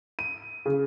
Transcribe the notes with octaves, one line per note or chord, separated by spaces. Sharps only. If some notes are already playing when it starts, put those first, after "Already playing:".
D#7
C#3